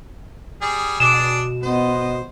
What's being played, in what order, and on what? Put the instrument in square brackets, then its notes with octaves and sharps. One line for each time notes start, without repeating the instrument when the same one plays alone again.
[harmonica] G3 G#4 G#5
[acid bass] B2 [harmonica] D4 G#4 D5 [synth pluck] E7
[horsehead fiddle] B3 D#5 [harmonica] C5